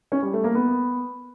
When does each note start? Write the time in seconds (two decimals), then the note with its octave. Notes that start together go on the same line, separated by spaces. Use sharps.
0.12 C#4
0.23 G3
0.33 A3
0.44 A#3
0.55 B3